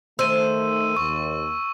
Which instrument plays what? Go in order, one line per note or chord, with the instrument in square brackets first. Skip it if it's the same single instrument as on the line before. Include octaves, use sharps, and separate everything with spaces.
[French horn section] D#3 A3 [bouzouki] C5 [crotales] E6 D#7
[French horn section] D#2 [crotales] C#6